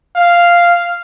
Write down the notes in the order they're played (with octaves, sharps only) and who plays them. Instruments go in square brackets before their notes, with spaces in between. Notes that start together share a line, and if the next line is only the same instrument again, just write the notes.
[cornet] F5